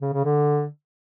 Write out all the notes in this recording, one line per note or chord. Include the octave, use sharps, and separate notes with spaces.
C#3
C#3
D3